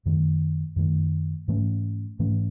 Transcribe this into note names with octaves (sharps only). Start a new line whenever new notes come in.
F#2 D#3 A3
F#2 D#3 A3
G#2 E3 A3 C#4
G#2 E3 A3 C#4